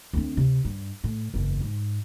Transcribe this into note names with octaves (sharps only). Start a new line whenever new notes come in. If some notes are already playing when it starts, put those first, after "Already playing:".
D2 C4
C3
G2
A2
F#1 E2
G#2